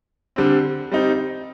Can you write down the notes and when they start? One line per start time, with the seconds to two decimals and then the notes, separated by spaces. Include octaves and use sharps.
0.36 D3 G3 C4
0.91 G3 C4 D#4